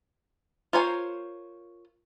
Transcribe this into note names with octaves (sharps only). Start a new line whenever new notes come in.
F4 A#4 C5 C#5 G#5